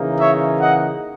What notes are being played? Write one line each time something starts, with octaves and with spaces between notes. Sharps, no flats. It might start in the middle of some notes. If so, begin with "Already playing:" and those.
Already playing: C#3 E3 A#3 D#4
C#5 E5
D#5 F#5